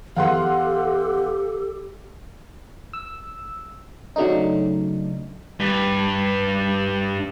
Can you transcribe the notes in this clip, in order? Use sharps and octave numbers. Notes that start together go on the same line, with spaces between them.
E2 G4 A4 F5 F#5 C6
E6
C#3 F#3 A3 D4 D#4
G2 B4